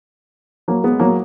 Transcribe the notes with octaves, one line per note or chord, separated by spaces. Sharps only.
F#3 A#3
G#3 B3
F#3 A#3